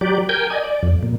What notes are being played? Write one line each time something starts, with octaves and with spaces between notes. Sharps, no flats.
F#3 G4 D5
A#4 G5 G#5 G6
D5 D#5 G#5
D5
F2
A#2